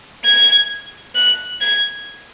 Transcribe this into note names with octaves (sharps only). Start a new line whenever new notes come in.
G#6
F#6
G#6